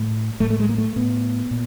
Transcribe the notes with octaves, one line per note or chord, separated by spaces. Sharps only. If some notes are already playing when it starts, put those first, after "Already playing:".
Already playing: A2
A2 A3
A3
G#3
A#3
A3
A2 B3
A#2